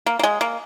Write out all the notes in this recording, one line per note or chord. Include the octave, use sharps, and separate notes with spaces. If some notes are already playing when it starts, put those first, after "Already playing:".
A#3
A#3
G#3
A#3